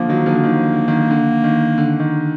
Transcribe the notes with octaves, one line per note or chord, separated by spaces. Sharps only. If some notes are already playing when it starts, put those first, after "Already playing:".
Already playing: D3 F3 A#3
D#3 F#3
D3 F3
D#3
D3
D#3
D3
D#3
D3
D#3